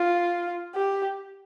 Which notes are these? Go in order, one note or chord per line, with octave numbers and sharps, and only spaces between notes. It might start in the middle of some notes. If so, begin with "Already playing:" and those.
Already playing: F4
G4